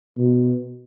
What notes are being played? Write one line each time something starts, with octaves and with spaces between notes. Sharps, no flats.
B2